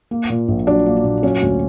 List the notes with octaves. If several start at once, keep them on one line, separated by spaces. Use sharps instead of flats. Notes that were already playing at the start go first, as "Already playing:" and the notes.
A#3
A#2
A#1
F#3 D4
A#3
A#2
F#3 C#4
D2